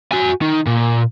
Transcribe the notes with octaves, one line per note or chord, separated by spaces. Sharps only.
F#4 G#5
D#3
A#2